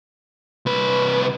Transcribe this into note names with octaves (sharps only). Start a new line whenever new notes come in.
C2 B4